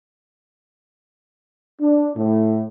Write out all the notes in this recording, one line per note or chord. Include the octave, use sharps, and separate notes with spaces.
D4
A2